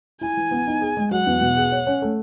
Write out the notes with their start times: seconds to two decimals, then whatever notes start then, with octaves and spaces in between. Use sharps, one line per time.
0.21 E4 G#5
0.37 E3
0.51 B3
0.67 D#4
0.81 G#4
0.97 G#3
1.11 F#3 F#5
1.27 E2
1.41 B2
1.57 G#4
1.72 C#5
1.87 C#4
2.02 A3